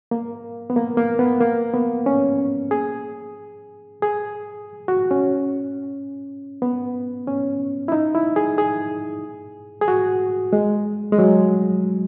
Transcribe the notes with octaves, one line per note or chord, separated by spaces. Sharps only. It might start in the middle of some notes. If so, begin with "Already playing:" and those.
A#3
B3
A#3
A#3
B3
A#3
B3
C#4
G#4
G#4
F#4
C#4
B3
C#4
E4
D#4
E4
G#4
G#4
G#4
F#4
G#3
G#3
F#3